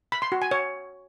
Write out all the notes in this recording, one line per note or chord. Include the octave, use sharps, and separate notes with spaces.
B5
C6
F#4
G#5
C#5